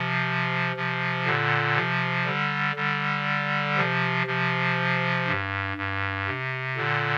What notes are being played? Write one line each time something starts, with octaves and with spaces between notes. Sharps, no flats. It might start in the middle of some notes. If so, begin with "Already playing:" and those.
Already playing: C3 F3
C3 F3
A#2 D3
C3 F3
D3 G3
D3 G3
C3 F3
C3 F3
G2
G2
C3
A#2 D3